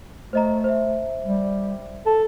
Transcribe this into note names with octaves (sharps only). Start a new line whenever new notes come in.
A3 C5 D#5 A#5
C5 E5
G3
A4